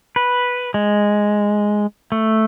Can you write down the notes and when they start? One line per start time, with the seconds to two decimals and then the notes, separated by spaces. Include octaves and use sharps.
0.16 B4
0.74 G#3
2.12 A3